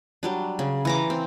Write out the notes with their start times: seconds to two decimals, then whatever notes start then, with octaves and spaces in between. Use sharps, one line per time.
0.23 F#3 G3 D4
0.59 C#3
0.85 E3 A#5 D6
1.10 C4